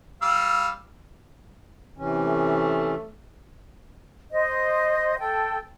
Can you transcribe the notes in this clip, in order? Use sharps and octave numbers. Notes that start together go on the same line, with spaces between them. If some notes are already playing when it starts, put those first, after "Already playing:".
G3 F5 E6
C3 E3 C#4
A3
C5 D#5
A4 G5